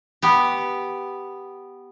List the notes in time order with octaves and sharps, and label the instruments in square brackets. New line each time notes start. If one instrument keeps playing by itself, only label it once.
[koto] B3 G4